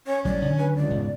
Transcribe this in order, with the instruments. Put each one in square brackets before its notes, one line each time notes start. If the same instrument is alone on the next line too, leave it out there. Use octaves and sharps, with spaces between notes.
[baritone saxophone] C#4 [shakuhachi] C#5
[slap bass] A1 F#3 G3 [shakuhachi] D5
[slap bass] D3 D#3 F#3
[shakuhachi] B4
[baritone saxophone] C#2 [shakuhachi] D5
[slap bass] E1 G#2